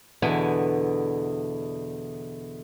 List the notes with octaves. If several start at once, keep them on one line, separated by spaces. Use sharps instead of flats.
E2 B2 D3 E4 G#5 A5